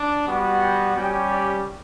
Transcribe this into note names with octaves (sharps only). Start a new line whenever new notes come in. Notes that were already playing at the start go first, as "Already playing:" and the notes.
Already playing: D4
G3 B3 F#4
G5
G3 C#4 G4 G5
D5